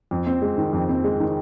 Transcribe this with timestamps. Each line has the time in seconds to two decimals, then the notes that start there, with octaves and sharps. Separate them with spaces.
0.11 F2
0.27 C4
0.42 G#3
0.58 D#3
0.73 F2
0.89 C4
1.04 G#3
1.20 D#3